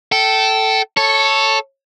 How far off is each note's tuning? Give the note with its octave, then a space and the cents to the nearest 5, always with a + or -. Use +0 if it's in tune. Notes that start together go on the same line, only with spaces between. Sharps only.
A4 +0 G5 -25
A4 +0 C#5 +0